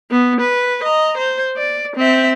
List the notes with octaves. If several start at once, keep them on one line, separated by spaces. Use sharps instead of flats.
B3
B4
D#5 A#5
C5
D5
C4 E5